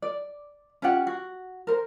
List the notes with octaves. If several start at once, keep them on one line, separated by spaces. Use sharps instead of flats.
D5
C#4 F4 G4 F#5
F#4
A#4 C5